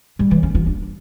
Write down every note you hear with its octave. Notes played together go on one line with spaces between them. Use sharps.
G3
E3
C#4
F4
D4